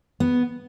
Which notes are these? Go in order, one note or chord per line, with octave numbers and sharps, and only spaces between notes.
B3